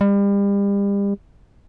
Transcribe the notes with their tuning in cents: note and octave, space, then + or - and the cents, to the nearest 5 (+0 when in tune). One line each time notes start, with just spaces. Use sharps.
G3 +35